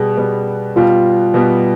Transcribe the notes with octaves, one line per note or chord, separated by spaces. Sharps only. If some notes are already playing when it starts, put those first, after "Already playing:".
Already playing: B2 G3 B3 G#4
B2 G3 B3
B2 G3 B3 F4
B2 G3 B3